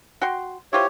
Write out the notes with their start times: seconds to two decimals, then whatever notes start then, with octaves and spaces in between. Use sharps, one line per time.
0.21 F#4 G5 C6
0.73 E4 F4 G4 C5 C#5